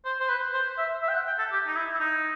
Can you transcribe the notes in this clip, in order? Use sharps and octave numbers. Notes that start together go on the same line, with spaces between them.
C5
C5
B4
C5
E5
E5
G5
F#5
G5
A4
G4
D#4
E4
E4
D#4